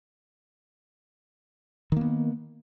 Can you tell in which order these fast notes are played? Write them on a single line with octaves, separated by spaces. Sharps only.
D#3 A#3 B3